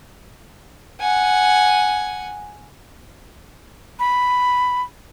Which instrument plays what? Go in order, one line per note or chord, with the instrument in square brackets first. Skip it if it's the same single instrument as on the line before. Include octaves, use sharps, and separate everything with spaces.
[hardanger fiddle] F#5 G#5
[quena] B5